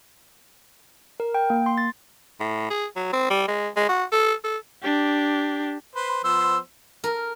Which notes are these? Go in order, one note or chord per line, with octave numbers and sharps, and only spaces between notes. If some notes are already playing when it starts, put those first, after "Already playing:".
A#4
G5
A#3
C6
A6
A2
G#4
F#3
C4
G3
G#3
G#3
F#4
A4
A4
D4 G4
B4 C5
F3 B3 C5 E6
A#4